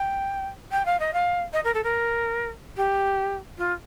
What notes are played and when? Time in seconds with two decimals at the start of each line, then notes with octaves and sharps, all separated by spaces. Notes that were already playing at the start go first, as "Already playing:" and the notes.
Already playing: G5
0.71 G5
0.85 F5
1.00 D#5
1.13 F5
1.53 D#5
1.64 A#4
1.74 A4
1.83 A#4
2.77 G4
3.58 F4